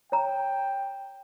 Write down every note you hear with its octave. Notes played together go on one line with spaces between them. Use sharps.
C#5 G5 A#5